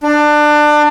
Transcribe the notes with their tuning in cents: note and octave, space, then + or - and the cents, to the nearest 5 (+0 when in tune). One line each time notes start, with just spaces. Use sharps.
D4 +25